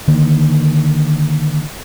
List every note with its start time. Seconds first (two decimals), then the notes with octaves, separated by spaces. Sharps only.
0.08 D3 D#3 A#3